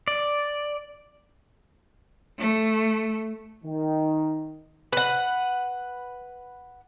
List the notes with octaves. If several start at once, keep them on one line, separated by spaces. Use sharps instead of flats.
D5
A3
D#3
B4 F#5